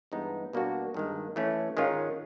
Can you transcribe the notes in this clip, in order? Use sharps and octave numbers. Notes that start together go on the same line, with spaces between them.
G2 E3 G#3 B3 D#4
B2 G3 A#3 D4 F#4
G2 D#3 G#3
E3 A3 C#4
G#2 D#3 G#3 C#4 F4